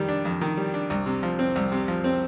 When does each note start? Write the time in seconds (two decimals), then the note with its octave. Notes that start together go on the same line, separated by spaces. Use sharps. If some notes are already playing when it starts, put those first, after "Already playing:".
Already playing: F2 D#3 G3
0.08 D4
0.25 F2
0.41 D#3
0.57 G3
0.74 D4
0.90 C2
1.06 C3
1.23 F3
1.39 C4
1.56 C2
1.72 C3
1.88 F3
2.04 C4